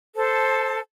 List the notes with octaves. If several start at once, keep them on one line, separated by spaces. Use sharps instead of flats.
A4 C5 A5